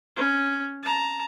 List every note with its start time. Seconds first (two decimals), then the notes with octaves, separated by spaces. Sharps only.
0.16 C#4
0.83 A5 A#5